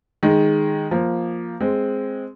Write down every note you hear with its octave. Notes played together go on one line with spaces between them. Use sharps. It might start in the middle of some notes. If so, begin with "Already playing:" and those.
D#3 G#3
F3 A#3
G#3 C4